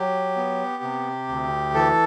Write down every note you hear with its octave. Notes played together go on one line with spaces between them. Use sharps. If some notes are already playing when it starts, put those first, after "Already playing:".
Already playing: F#3 G4
B3
C3
D2
E3 A4